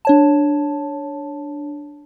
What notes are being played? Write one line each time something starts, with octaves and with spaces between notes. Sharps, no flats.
D4 C#5 A5